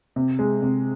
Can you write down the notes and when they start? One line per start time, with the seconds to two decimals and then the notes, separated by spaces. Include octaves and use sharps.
0.16 C3
0.39 G#3
0.62 C3